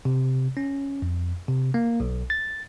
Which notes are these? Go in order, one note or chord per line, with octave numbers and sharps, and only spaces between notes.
C3
C#4
F2
C3
A#3
B1
A6